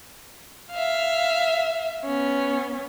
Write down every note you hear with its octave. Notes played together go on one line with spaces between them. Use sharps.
E5 F5
B3 C#4